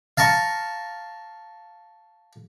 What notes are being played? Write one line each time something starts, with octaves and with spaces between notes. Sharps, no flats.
F5 A5 A#5 C#6